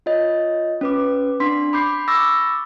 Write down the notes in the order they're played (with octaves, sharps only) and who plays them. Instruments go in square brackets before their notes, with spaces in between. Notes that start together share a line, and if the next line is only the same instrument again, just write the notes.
[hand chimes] F4 C#5 D#5
C#4 B4 D6
C4 D4 C6 B6
B5 D6 G6 C7
B5 C#6 D6 E6 A6 A#6